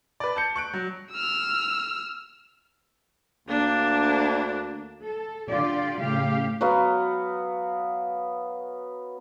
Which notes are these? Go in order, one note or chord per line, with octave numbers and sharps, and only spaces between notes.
B4 D5
A5 G6 C#7
C#6 F#6 D7
F#3
E6 F6
D2 A#3 D4
A4
D3 F4 G4 D5
A2 C#3 G4 F5
F#3 B3 F5